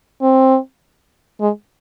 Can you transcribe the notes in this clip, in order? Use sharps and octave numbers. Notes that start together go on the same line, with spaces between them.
C4
G#3